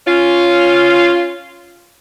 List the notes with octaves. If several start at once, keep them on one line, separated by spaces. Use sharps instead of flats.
C#4 F4